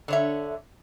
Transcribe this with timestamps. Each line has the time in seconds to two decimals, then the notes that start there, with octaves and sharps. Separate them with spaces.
0.08 D3 C#5 E5